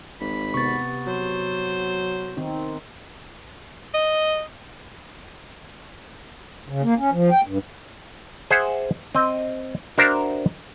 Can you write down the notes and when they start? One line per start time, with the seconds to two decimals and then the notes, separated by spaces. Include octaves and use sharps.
0.21 G#1 B5
0.54 C3 B3 C#6 A6
1.07 F#3 C5
2.37 D#3 C4 D#4
3.94 D#5
6.69 C#3
6.83 A#3
6.99 C#4
7.13 F3
7.31 G5
7.47 G2
8.50 G#4 C5 E5 F#5
9.15 C4 D#5
9.98 D4 F#4 A#4 C5 E5 A#5